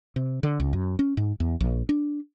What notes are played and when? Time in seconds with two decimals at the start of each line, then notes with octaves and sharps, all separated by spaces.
0.16 C3
0.43 D3
0.60 C#2
0.73 F#2
0.99 C#4
1.17 G#2
1.40 E2
1.60 A#1
1.89 D4